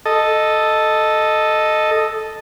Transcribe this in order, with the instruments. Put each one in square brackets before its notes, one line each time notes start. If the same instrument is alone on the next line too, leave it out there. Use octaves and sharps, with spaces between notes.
[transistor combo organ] A4 D#5